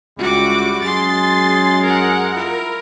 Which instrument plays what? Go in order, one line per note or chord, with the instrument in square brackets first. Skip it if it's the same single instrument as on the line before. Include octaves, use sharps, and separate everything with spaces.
[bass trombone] C#2 [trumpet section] G3 E4 G4 [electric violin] F#4 D6
[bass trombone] F#2 [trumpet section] G#3 G#4 [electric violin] C6 A6
[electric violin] A#4 F#5
[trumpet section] E4 F4 [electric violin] A#4